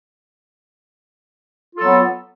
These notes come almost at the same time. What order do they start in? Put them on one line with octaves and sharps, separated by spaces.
F4 A4 F#3 B3